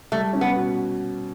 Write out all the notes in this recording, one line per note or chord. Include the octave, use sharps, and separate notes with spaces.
G3 A3
C#4
B3
B2